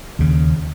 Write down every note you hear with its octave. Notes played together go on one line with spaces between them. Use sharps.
D#2 C#3